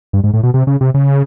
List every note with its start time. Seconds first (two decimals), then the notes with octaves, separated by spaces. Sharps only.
0.13 G2
0.24 G#2
0.34 A2
0.43 B2
0.54 C3
0.67 C#3
0.81 C3
0.94 C#3